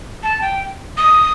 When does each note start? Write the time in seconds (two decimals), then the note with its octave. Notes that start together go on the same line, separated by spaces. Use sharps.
0.23 A5
0.41 G5
0.97 D#6